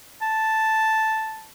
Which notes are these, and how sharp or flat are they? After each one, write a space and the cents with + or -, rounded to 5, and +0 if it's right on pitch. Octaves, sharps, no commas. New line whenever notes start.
A5 +0